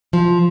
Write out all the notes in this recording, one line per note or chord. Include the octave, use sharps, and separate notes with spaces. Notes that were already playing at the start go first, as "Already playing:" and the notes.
F3